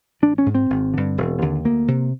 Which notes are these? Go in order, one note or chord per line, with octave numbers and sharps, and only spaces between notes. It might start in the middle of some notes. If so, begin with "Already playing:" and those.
A1 D4
C#4
G#2
C4
G#1
G2 D3
E1
D#2 D3
D2 A#3
C3